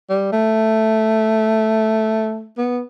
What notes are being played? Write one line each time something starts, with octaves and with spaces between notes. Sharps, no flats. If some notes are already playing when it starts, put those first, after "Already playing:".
G3
A3
B3